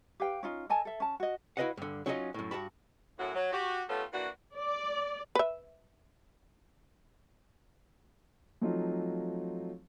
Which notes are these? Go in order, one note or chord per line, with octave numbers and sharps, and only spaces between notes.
G4 B4 F5 G5
C#4 D#4 F4
A4 D#5 G#5 A5
A4 E5
C#4 A5
F#4 D#5
E4 F#4 B4 D#5 F5 F#5
G2 D3
F#3 C#4 D#4 F4 A4 D#5
F#2 A2
G2 F#4 A5 B5
F#2 A2 F#4
F#3
F#4 G4
G3 A3 B3 C#4 F4 A4
E3 A#3 D4 F#4
D5
B4 E5
F3 F#3 A3 C4 D#4 F4